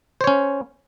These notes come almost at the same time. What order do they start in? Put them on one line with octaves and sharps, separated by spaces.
C5 C#5 C#4